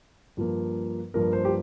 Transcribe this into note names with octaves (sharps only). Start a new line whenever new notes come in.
G2 F3 A#3
G2 F3 A#3 A#4
C5
G4